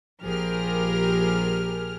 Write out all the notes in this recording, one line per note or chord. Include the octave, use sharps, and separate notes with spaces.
A#1 F3 G4 G#4 A#4 F6